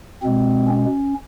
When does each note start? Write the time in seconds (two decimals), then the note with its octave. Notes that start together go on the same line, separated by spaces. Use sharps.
0.23 B2 G#3 C4
0.67 C#4